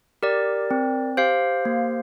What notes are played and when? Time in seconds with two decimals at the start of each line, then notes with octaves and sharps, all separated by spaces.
0.22 G4 A#4 D5
0.71 C4
1.17 G4 C5 F5
1.65 A#3